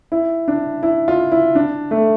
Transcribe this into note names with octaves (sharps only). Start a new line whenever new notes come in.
E4
D4
E4
F4
E4
D4
A3